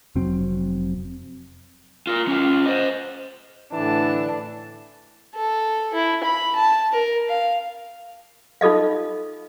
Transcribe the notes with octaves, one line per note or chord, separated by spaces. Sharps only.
F1 F#3 C4
F4 A#4
C#4 F4
C5 D#5
A2 D3 E3 D4 A5
A4
E4
B5
A5
A#4
F5
D#4 F4 A4 D#5 F5